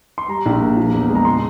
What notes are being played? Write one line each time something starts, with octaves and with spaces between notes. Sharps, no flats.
C6
G3 A#5
A#1
A#3
F3
E2
G#3
A#5
C#3 C6